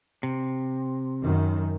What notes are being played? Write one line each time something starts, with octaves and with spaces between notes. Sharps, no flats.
C3
F#2 D#3